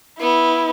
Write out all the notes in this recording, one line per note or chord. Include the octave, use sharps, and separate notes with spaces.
B3 E4